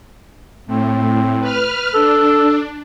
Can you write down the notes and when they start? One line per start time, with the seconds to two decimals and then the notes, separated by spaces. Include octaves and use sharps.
0.67 A2 C4
1.41 B4 F6
1.94 D4 A4